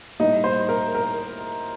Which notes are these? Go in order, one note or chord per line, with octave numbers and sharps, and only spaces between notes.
A2 G3 A#3 D#4 D#5
C5
A#4
A#4